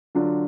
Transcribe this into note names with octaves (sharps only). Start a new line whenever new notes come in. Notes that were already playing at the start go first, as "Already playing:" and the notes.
D3 F#3 D4 F4